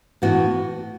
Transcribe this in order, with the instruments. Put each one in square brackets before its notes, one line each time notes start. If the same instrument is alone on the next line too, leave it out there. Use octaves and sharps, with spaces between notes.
[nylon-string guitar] A2 E3 B3 F#4